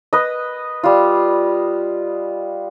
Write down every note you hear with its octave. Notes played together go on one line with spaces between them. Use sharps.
B4 D#5
G3 F4